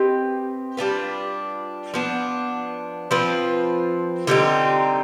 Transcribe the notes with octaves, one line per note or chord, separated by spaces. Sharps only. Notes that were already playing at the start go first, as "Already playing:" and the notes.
Already playing: C4 G4 B4 D#5
G3 D4 F4 B4
F3 B3 D4
F3 C4 F4 B4
D3 G3 C4 D#4